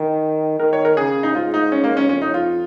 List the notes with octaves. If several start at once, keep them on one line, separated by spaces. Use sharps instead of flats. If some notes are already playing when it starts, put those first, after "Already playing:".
Already playing: D#3
D#3 A#4
C#5
A#4
C#3 G#4
D#4
G#2 F4
D#4
C#4
A#3
C#4
F2 C#4
D#4
F4